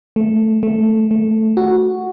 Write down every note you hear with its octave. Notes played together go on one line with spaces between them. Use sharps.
A3
A3
A3
F#4